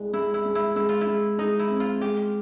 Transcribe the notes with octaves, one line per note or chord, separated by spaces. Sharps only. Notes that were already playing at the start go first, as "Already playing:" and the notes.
Already playing: C2 G#3
G#3 E4
E4
G#3
E4
G#3 E4
F4
E4
G#3
G#3 D#4
E4
C4
F4
G#3 G4